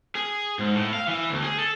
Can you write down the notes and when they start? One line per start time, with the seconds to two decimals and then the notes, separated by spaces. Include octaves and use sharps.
0.15 G#4
0.59 G#2
0.74 A2
0.93 F5
1.08 E3
1.30 D2
1.43 G#4
1.59 A4